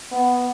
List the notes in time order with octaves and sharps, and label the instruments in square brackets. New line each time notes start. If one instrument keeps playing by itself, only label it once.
[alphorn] B3